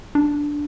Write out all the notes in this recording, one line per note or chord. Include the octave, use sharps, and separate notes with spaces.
D4